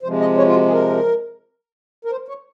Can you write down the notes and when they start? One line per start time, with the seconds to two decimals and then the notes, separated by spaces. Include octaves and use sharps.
0.03 C3 F3 G#3 C5
0.20 D#5
0.37 C#5
0.46 F4
0.54 F#4
0.68 G#4
0.72 A#4
2.05 A#4
2.11 C5
2.28 C#5